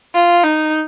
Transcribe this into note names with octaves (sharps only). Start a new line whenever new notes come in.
F4
D#4